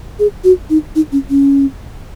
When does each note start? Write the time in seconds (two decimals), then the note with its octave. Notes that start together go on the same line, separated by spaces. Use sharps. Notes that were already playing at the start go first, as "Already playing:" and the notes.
0.19 G#4
0.44 F#4
0.70 D#4
0.95 D#4
1.12 C#4
1.30 C#4